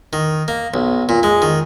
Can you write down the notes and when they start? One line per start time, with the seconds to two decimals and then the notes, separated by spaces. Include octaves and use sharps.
0.13 D#3
0.48 A#3
0.74 B1
1.09 A#2
1.23 G#3
1.42 D#3